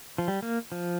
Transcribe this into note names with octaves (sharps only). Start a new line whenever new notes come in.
F3
G3
A#3
F3